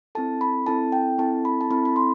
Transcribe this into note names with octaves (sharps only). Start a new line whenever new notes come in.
C4 E4 A4 A5
B5
C4 E4 A4 A5
G5
C4 E4 A4 A5
B5
A5
C4 E4 A4 B5
B5
C6